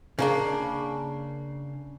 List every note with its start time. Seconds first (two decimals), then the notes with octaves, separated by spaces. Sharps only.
0.19 C#3 A#3 D4